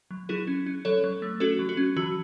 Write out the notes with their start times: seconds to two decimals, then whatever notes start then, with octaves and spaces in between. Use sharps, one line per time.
0.11 F#3
0.29 F#3 E4 G#4
0.47 C#4
0.66 C#4
0.85 F#3 A4 C#5
1.04 F#3
1.22 A3
1.40 C#4 F#4 A4
1.59 F#3
1.69 F#4
1.77 C#4
1.97 E3 F#4